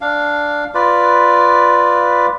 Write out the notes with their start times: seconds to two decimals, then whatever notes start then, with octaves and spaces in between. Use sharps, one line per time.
0.01 D4 F5
0.75 F4 B4 D5